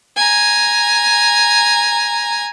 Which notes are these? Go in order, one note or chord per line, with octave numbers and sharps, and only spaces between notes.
G#5 A#5